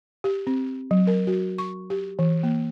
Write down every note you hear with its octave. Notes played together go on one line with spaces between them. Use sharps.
G4
C4
F#3
A#4
F#4
C#6
G4
E3
A#3